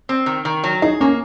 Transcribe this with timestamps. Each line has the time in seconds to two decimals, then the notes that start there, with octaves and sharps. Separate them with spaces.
0.09 C4
0.26 D#3
0.45 D#3
0.64 F#3
0.82 D#4 G#4
1.01 A#3 C#4